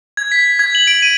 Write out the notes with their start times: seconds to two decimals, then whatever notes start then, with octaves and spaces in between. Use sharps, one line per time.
0.17 G#6
0.32 B6
0.59 G#6
0.75 F#7
0.87 D7
1.02 D#7